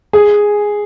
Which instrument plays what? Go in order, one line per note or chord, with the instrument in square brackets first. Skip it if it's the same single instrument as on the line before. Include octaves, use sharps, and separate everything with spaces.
[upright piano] G#4